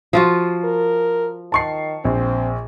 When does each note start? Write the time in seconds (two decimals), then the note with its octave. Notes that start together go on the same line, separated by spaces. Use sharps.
0.13 F3 F4 F#4
0.64 A#4
1.52 D#3 A5 C#6 C7
2.05 A#1 C4